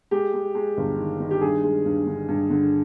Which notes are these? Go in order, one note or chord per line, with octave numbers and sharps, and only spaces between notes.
G#3 G4
G#3
G#3
G1
D#3
D#3
G4
G2 G#4
G#3
G2
D3
G2
D3